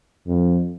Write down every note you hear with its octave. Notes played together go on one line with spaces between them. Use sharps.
F2